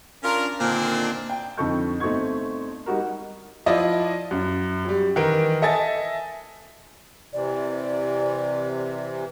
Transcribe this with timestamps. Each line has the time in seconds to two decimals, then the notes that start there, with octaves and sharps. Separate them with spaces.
0.23 C#4 D4 F4 A#4
0.60 A#2 D3 D#3 A#3 C4 D4
1.30 G5
1.57 F2 D3 D#4 A4 C#6 G6
2.00 G1 A3 C4 D#4 C#6 G#6
2.86 G3 D#4 F#4 A#4
3.66 F3 E4 F4 D5 D#5
4.31 F#2
4.85 F#3 G3
5.16 D#3 E3 A#4 D7
5.62 A4 D#5 E5 G#5 A6
7.33 C3 E3 D5